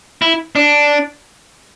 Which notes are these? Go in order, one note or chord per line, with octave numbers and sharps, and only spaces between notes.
E4
D4